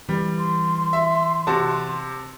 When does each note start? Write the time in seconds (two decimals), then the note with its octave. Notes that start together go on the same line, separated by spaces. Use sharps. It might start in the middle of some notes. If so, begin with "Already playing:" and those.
0.09 E3 G3
0.39 C6
0.93 E5
1.47 C3 F#4 A5